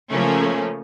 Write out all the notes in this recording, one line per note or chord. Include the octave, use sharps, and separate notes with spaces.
C#3 F3 A3 A#3 C#4